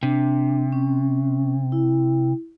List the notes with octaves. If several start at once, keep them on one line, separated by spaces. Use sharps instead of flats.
C3 D4
C#4
E4